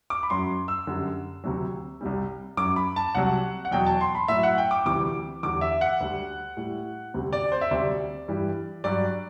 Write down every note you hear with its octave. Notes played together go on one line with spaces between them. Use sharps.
D6
B5
F#2 F#3 C6
E6
F#2 D3 G3
D2 C3 F#3
C2 C3 G3
F#2 F#3 D6
B5
A5
C2 C3 F#3 F#5
F#5
E2 B2 F#3 G5
A5
C6
B5
A2 F#3 E5
F#5
G5
D6
D2 C3 E3 G3 D6
E2 D3 G3 D6
E5
F#5
D2 D3 G3
A2 G3
D2 C3 G3
D5
C5
E5
D2 C3 G3 D5
G2 E3 G3
G2 F#3 D5